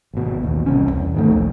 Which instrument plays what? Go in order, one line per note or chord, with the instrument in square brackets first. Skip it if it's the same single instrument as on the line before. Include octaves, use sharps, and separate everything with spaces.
[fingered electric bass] G#1 B2
A1 D#2
E1 C2 C#4
E2
G#2 D#3 F3 A3
A#1 D#2